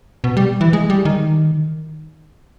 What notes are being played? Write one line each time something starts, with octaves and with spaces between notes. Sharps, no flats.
B2
G3
E3
G#3
G3
D#3